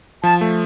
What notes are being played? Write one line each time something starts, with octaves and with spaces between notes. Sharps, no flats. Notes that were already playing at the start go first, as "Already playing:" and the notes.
F3 A5
A3